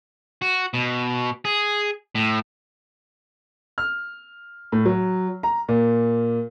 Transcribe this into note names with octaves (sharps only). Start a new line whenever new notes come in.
F#4
B2
G#4
A2
F6
A2
F#3
A#5
A#2